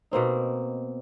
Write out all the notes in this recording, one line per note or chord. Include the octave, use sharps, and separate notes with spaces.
B2 A#3 C4 D#4